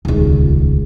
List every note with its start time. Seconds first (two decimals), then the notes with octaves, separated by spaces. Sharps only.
0.05 D#1 C#2